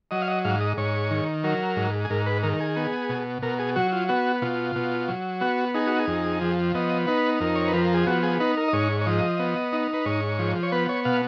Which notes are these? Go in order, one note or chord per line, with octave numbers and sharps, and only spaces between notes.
F#3 D#5
F5
D#5
G#2 F5
D#5
G#2 C#5
D#3
F#3 A#4
G#2
G#4
G#2 A#4
B4
D#3 A#4
A#4
G#4
B3
B2
B2 A#4
G#4
F#3 F#4
F4
B3 F#4
B2 F4
B2
F#3
B3 F#4
D#4 G#4
F#4
G#4
F2
F3
B3 D#5
D#4 B4
F2 A#4
C#5
B4
F3
A#4
G#4
B3 F#4
G#4
D#4 B4
A#4
D#5
G#2 C#5
C#5
F3 D#5
B3
D#4
B4
G#2 C#5
F3
C#5
B3 B4
C#5
B2 F5